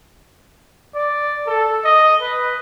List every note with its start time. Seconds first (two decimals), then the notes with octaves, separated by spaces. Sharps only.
0.95 D5
1.47 A4
1.84 D#5
2.21 B4